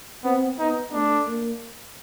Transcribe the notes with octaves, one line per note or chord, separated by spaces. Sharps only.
B3 C4
B3 D#4
A3 D4
A#3